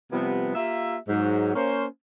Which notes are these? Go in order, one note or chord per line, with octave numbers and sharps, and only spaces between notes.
C3 F3 G3 B3
A#3 F4 G4 E5
G#2 F#3
A#3 C#4 C5